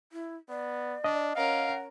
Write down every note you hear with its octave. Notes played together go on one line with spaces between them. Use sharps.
E4
B3 D5
D4 D#5
C#4 A#4 F5 F#5